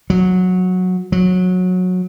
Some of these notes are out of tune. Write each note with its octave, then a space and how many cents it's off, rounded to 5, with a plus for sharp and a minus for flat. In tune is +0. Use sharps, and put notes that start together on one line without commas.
F#3 -15
F#3 -20